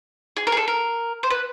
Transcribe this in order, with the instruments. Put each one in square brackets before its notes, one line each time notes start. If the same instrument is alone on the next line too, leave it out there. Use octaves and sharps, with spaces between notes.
[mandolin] G#4
A#4
G#4
A4
A#4
C5
B4